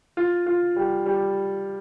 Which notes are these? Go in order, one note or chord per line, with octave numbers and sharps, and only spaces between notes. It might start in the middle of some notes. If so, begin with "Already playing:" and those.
F4
F4
G3
G3